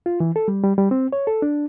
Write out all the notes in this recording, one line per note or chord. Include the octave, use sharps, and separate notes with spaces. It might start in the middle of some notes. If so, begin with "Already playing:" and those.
F4
E3
A4
G3
G3
G3
C4
C#5
A4
D4